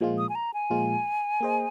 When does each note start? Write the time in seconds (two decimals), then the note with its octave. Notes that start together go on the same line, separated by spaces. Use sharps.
0.01 A#2 F3 G#3 F4
0.18 D#6
0.29 G#5
0.35 A#5
0.54 G#5
0.70 A#2 F3 G#3 F4
1.40 A#3 G#4 C5 D#5